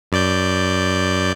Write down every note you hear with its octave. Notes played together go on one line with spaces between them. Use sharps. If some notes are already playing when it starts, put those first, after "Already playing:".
F#2 D5 G6